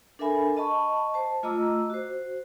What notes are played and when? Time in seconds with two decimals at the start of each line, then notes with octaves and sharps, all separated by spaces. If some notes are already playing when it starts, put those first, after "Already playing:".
0.19 D4 A4 A#4 E5 G#5 B5
0.57 D#5 A5 B5 C#6
1.14 C5 A5
1.43 A3 F4 D#5 A#5 D6 E6
1.90 F#4 C5